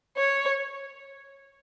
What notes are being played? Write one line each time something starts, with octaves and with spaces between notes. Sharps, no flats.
C#5